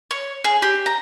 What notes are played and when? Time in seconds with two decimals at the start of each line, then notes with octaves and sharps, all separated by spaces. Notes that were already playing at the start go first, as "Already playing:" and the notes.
0.11 C#5
0.44 G#4
0.62 G4
0.86 A#5